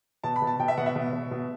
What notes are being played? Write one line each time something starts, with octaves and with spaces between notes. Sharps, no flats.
B2 A5
B5
B2
A5
B2 G5
E5
B2 F#5
E5
B2
B2
B2